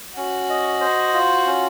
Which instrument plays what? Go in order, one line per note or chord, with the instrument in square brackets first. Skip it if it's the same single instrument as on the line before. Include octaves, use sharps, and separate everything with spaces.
[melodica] C#4 [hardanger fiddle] F#4
[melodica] D#5
C5
F4
C#4